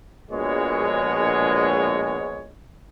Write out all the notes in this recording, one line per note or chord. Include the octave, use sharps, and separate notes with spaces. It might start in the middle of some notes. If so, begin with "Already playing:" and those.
A#1 B2 G#3 C#5